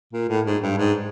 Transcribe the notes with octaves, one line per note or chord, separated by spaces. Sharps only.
A#2
A2
G#2
G2
G#2